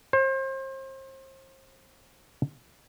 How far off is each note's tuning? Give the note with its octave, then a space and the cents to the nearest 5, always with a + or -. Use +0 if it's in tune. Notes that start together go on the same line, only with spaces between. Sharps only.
C5 +35